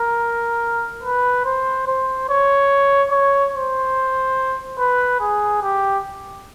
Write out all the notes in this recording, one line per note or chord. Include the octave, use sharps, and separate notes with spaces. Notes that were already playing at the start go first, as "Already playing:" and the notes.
Already playing: A#4
B4
C5
C5
C#5
C#5
C5
B4
G#4
G4